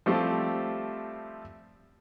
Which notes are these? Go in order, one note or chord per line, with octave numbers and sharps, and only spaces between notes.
F3 G3 A3 C4 E4 G4